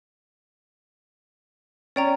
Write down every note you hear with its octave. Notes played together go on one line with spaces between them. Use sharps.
C#4 D5 G5 A#5